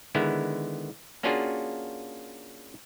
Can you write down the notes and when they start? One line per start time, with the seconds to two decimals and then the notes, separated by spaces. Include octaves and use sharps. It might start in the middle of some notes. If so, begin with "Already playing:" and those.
0.15 D3 D#3 G#3 B3 E4
1.23 A#3 C#4 D4 F4 F#4 G#4